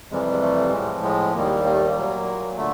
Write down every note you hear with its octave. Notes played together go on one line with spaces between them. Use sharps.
F2 C3 E3 G3 G#3
G#3
A3
A2 F3 G#3
G#3
D#2 D#3 G3 A#3
A#3
A3
A#3
A#2 F#3
D3 A3